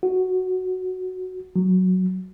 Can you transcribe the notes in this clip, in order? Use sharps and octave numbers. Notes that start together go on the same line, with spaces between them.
F#4
F#3